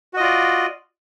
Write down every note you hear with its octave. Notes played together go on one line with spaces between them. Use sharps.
F4 F#4 D5 D#5